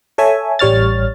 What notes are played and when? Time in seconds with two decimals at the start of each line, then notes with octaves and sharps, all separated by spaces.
0.18 A4 C#5 E5 G#5
0.59 A1 G3 C#5 F6 A6